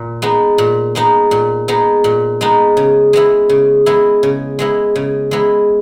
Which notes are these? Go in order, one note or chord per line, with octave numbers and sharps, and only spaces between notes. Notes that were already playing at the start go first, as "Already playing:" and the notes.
Already playing: A#2
G#3 B3 D#4
A#2
G#3 B3 D#4
A#2
G#3 B3 D#4
A#2
G#3 B3 D#4
C#3
G#3 B3 E4
C#3
G#3 B3 E4
C#3
G#3 B3 E4
C#3
G#3 B3 E4